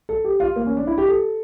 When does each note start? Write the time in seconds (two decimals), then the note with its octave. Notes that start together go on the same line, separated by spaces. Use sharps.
0.09 A4
0.25 G4
0.40 F4
0.56 A#3
0.66 C#4
0.77 D4
0.87 E4
0.98 G4
1.08 A4